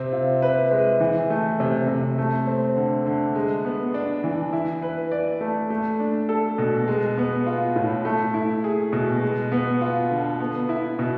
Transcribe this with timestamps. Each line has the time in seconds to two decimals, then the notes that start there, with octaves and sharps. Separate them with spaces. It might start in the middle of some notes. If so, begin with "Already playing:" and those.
Already playing: C3 C4
0.12 F4
0.42 B4
0.71 G#3
1.00 E3
1.30 A3
1.60 C3
1.88 C3
2.18 A3
2.47 C4
2.76 D3
3.06 D3
3.35 G#3
3.65 B3
3.94 D4
4.24 E3
4.53 E4
4.82 B4
5.11 D5
5.41 A3
5.70 A3
6.00 D4
6.29 A4
6.58 B2
6.88 G#3
7.18 B3
7.46 F4
7.76 A2
8.05 A3
8.34 E4
8.64 G#4
8.93 B2
9.23 G#3
9.52 B3
9.81 F4
10.11 D3
10.40 B3
10.69 E4
10.99 B2